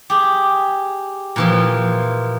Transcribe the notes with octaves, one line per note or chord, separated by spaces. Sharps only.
G4 G#4
A#2 E3 F3